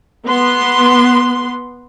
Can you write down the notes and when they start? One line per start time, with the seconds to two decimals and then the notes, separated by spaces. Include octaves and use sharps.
0.24 B3 C6